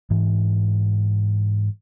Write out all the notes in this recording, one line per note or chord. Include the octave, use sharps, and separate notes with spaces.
G#2 E3